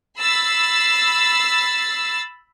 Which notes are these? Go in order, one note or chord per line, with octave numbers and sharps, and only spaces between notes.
B5 E6 A6 C7